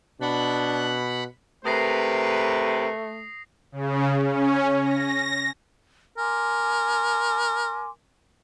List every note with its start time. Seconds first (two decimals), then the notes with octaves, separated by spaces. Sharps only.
0.21 B2 D4 F#5 B5
1.65 C3 A3 A#4 B4 D#6 A#6 C7
3.72 C#3
4.21 C#4
4.81 A#6
6.18 A#4 G#5 C6 D6